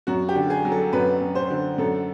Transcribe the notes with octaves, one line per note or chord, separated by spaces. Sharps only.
F#2 F#4
G4
D3
G#4
F#3
A4
F#2 B4
F#2
C5
D3
F#2 A4